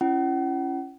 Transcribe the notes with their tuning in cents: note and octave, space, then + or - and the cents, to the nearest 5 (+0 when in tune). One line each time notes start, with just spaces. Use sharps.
C#4 +0 E4 +40 F#5 +40